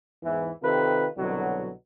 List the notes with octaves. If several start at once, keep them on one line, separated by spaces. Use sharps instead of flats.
E2 G#2 E3
C3 D#3 F4 A4 B4
C2 B2 D3 F#3